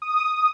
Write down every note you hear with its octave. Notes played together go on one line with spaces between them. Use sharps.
D#6